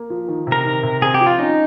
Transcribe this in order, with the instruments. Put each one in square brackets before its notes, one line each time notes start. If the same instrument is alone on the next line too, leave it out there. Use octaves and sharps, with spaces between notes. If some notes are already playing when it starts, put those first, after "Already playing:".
Already playing: [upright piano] A#3
F3
D#3
C3
[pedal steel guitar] A#4
[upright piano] D#3
C3
[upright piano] C4 [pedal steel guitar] G#4
[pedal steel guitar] G4
[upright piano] F3
[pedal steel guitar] F4
[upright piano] C#4 [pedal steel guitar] D#4